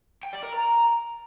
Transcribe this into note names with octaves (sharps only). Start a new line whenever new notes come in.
G5
D5
A#4
A#5